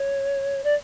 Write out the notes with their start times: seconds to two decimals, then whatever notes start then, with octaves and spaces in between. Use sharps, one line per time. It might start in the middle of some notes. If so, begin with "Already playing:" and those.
Already playing: C#5
0.63 D5